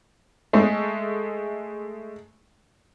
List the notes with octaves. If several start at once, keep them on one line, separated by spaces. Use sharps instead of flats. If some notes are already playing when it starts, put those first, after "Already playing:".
G#3 A3